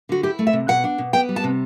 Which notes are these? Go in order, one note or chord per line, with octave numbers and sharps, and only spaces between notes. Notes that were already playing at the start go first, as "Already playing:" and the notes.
D3 F#4
E4 G4
A3
E5
C3
B2 F#5
D4
B2
B3 G5
G3
A5
C3